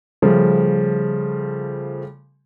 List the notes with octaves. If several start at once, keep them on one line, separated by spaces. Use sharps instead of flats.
C#3 F3 G3 A3